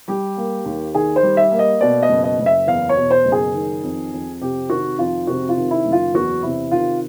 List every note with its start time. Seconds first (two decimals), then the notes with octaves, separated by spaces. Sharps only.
0.08 G3 G4
0.37 A#3
0.65 D#2
0.95 D#3 G#4
1.16 C5
1.23 G3
1.37 E5
1.52 A#3
1.59 D#5
1.81 B2 D5
2.03 D#5
2.09 F#1
2.24 D#5
2.39 F#1
2.46 E5
2.67 E2 F5
2.89 C#5
2.96 B2
3.11 C5
3.26 F#1
3.32 G#4
3.55 D#3
3.83 F2
4.13 F2
4.41 C3 G4
4.69 D#3 F#4
4.98 F2 F4
5.27 C3 F#4
5.49 F4
5.57 D#3
5.71 E4
5.86 F#1
5.92 F4
6.14 E2 F#4
6.43 C3 E4
6.71 D#3 F4